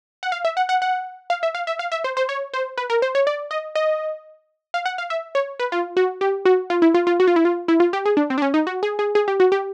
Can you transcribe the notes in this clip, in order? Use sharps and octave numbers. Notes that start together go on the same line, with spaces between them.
F#5
F5
E5
F#5
F#5
F#5
F5
E5
F5
E5
F5
E5
C5
C5
C#5
C5
B4
A#4
C5
C#5
D5
D#5
D#5
F5
F#5
F5
E5
C#5
B4
F4
F#4
G4
F#4
F4
E4
F4
F4
F#4
F4
E4
F4
E4
F4
G4
G#4
D4
C4
D4
C#4
D#4
F#4
G#4
G#4
G#4
G4
F#4
G4